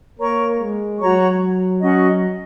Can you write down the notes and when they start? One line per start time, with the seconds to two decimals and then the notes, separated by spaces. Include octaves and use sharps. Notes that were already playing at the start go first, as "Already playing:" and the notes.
0.19 A#3 A#4 C#5 A#5 C#6
0.59 G#3
0.99 F#3 F#4 C#5 A#5 C#6
1.80 C#4 F#4 D#5